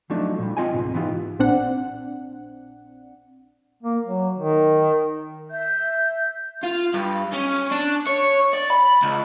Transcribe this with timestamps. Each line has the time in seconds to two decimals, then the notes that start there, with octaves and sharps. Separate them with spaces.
0.10 F3 F#3 A3 D4 D#4
0.39 A#2 G3
0.57 C4 F4 D#5 G5 G#5
0.72 C#2 G#2 B2
0.94 G#2 E3 B3 D#4 F4 G4
1.39 A#1 C4 D4 F#5
3.83 A#3
4.06 F#3
4.38 D#3
5.50 E5 G6
6.64 F4
6.94 G2
7.33 C#4
7.72 D4
8.07 C#5
8.53 D5
8.70 B5
9.03 C#2